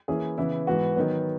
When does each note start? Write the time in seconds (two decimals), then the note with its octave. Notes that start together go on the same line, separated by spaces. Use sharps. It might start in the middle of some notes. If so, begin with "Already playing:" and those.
0.08 E3 A#3 C#4 E4 G#4
0.38 C#3 E3 B3 E4
0.67 G#2 E3 B3 F#4
0.96 D#3 F#3 B3